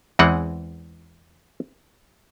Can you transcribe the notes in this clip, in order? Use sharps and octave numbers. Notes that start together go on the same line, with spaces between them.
E2 E3 G#3 C4 F#5